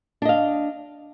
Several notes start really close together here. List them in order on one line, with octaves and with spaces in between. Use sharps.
D4 D#5 F5